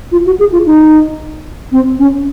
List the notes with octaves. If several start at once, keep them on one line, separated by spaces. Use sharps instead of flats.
F4
F#4
G#4
F4
D#4
C4
C#4